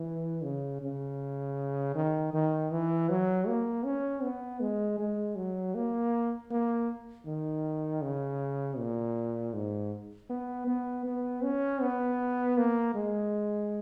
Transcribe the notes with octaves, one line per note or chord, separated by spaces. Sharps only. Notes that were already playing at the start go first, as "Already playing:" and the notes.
Already playing: E3
C#3
C#3
D#3
D#3
E3
F#3
A#3
C#4
B3
G#3
G#3
F#3
A#3
A#3
D#3
C#3
A#2
G#2
B3
B3
B3
C#4
B3
A#3
G#3